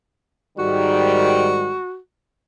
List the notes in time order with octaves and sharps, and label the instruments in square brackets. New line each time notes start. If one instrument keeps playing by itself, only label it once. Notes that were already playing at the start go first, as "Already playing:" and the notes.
[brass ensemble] G#2 D#3 G3 [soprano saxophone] F#4